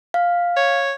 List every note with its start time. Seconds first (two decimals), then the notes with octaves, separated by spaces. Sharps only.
0.14 F5
0.57 C#5